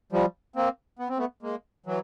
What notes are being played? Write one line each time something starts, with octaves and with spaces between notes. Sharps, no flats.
F3 G3
A#3 C4
B3
C4
A3 B3
G#3 A#3
E3 F#3